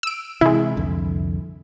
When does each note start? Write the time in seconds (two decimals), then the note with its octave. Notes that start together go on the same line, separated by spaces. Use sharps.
0.03 E6 D7
0.41 C3 E3 G#3 E4
0.77 C2 F2 D3